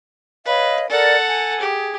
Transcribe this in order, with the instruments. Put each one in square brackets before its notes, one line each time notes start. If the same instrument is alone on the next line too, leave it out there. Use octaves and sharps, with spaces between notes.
[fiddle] B4 [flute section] C#5 D#5 F5
[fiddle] A4 F#5 [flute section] A#4 D5
[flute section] G#5
[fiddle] G4 [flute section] G#4